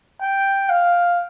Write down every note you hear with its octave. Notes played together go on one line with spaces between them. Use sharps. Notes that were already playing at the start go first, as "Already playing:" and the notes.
G5
F5